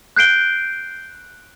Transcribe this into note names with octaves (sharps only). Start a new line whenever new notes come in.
F#6 G6 C7 D7 G7